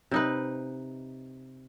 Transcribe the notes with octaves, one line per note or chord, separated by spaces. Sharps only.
C3 D#4 B4